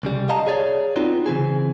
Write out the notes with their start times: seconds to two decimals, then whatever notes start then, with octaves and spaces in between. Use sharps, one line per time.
0.03 C2 C#3 G3
0.29 D#5 F5 A5 A#5
0.47 G#4 C#5 D5
0.96 B3 C4 D#4 F4 F#4
1.26 C#3 E3 C4 G#4